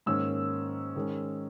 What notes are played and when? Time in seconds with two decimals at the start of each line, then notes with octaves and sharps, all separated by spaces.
0.06 G#2 D#3 A#3 C#4 E6
0.95 D#3 G#3 C#4